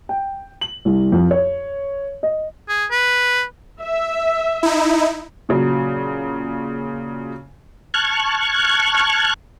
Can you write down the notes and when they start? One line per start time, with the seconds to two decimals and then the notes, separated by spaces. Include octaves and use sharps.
0.09 G5
0.61 F#7
0.85 C2
1.12 F2
1.31 C#5
2.23 D#5
2.69 G#4
2.91 B4
3.81 E5
4.63 D#4 E4
5.49 A#2 C#3 F#3
7.94 A5 C#6 F6 F#6 G#6